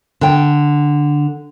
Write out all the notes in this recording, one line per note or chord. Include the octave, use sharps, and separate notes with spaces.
D3 G5